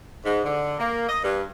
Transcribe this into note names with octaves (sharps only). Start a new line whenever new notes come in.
G#2
D3
A#3
D#5
G2